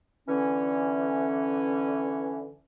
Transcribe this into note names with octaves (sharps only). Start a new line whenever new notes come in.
D3 E3 C#4